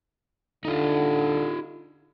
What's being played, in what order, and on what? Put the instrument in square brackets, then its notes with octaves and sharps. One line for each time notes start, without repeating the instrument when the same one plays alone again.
[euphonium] D3 [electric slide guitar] D#4 F4